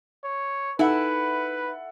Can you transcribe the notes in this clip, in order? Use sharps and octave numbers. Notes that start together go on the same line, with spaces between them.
C#5
D#4 E4 A4 B4 E5 F#5